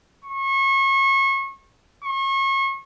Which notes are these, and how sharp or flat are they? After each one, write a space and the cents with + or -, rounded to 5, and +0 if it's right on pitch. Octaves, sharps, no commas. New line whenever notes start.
C#6 -30
C#6 -35